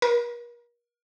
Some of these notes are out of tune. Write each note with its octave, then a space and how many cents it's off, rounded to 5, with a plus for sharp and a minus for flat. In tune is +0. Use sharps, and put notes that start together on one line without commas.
A#4 +40